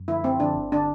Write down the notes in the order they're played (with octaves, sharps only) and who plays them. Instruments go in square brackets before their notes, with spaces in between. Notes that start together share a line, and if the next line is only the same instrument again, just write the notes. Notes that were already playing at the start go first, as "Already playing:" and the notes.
Already playing: [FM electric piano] F#2
[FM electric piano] D3 F3 [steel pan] E4
[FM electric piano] F#2 [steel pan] C4
[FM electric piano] D3 F3 [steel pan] D4
[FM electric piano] G1
[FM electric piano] D3 [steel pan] D4